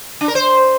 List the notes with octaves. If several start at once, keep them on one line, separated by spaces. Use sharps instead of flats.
D4
A#4
C5